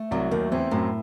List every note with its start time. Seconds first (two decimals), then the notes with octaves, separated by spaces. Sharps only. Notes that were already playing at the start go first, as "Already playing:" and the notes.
Already playing: A3
0.11 C2 C3 F#3
0.31 D#2 D#3 A3
0.51 E2 E3 C4
0.71 F#2 A2 F#3